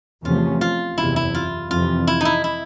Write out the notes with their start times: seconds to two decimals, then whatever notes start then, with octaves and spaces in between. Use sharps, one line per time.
0.24 E2 C3 F3 A3 C#4 F4
0.61 F4
0.98 F#1 E2 C3 E4
1.16 E4
1.35 F4
1.70 F2 C3 E3 F4
2.07 E4
2.21 D#4 E4
2.44 E4